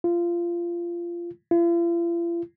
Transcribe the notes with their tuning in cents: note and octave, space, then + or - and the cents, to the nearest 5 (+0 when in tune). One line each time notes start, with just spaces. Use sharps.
F4 -20
F4 -45